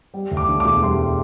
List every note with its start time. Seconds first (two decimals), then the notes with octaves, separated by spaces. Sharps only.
0.14 G3
0.31 D2
0.37 D6
0.48 D3
0.60 D6
0.65 E1
0.82 G3 C6